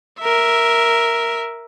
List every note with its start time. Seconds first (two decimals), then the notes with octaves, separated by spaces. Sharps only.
0.20 A#4 E5